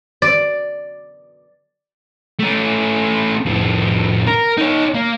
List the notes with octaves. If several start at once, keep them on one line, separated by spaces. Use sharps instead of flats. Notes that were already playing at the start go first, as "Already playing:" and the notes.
D5
A3 C#4
F2 A2
A#4
D#4 C#5
A#3